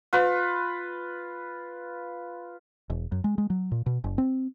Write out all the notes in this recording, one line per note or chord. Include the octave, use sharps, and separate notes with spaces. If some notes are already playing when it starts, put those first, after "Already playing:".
F4 B4
E1
F#2
G#3
G#3
F#3
A#2
B2
F#1
C4